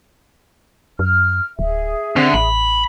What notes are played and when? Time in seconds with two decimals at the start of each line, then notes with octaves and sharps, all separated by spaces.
0.99 F#2 F6
1.59 D1 G#4 E5
2.16 D3 C4
2.34 A1 B5